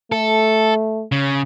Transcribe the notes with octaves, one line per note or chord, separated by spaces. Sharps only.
A3 A4
C#3